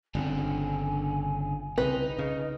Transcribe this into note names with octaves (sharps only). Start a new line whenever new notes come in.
G1 C#3 C4 D4 G#5
C2 C#3 C4 D#4 B4
C#3 D#5